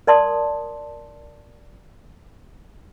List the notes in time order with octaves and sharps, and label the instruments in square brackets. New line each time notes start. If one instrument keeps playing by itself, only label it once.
[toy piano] A#4 D5 A5 C6 D#6